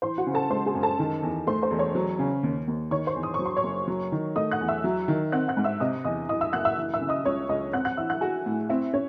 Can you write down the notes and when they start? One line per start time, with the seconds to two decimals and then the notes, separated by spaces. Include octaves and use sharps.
0.02 E3 C5 C6
0.18 F#4 F#5
0.27 C#3
0.34 A4 A5
0.50 G#3 C5 C6
0.66 G#4 G#5
0.75 F#2
0.83 A4 A5
0.99 D#3
1.23 E2
1.47 A3 C5 C6
1.62 C5 C6
1.71 E1
1.79 C#5 C#6
1.95 F#3
2.19 C#3
2.43 D#2
2.67 D#2
2.91 D#3 C#5 C#6
3.07 C5 C6
3.16 E2
3.23 D#6
3.34 F#3 C#6
3.46 C6
3.56 C#5 C#6
3.63 F#1
3.87 F#3
4.12 D#3
4.36 A3 D#5 D#6
4.51 F#5 F#6
4.60 E2
4.68 E5 E6
4.84 F#3
5.08 D#3
5.32 C4 F#5 F#6
5.48 F#5 F#6
5.57 G#2
5.64 E5 E6
5.80 C3 D#5 D#6
6.04 E2 D#5 D#6
6.29 E3 D#5 D#6
6.41 E5 E6
6.52 F#1 F#5 F#6
6.65 E5 E6
6.76 E3
6.94 E5 E6
7.01 C#3
7.08 D#5 D#6
7.25 C#2 C#5 C#6
7.49 C#2 D#5 D#6
7.73 C4 F#5 F#6
7.85 F#5 F#6
7.97 E3 E5 E6
8.10 F#5 F#6
8.21 F#4 G#4 G#5
8.46 A2
8.69 C4 E4 E5
8.93 C#4 C#5